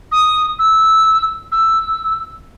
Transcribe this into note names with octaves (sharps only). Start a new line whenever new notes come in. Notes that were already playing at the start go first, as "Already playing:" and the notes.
D#6
E6
E6